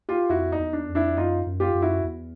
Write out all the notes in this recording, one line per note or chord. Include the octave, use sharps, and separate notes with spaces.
F4 G4
F2 E4 F#4
D#4
E2
D4
F2
D4 E4
F#2 D#4 F4
F#2
F4 G4
F#2
E4 F#4
E2